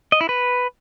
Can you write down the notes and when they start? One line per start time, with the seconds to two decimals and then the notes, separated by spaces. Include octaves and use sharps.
0.12 D#5
0.21 E4
0.29 B4